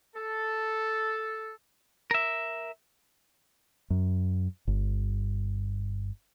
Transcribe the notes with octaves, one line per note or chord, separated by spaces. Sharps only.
A4
A#4 E5
F#2
G1